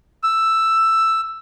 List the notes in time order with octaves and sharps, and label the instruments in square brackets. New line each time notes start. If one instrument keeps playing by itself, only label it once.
[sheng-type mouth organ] E6